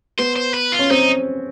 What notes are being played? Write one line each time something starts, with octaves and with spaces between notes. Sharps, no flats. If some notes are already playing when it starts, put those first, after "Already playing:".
B3 C5
C5
B4
F4
C#4
C4 D#4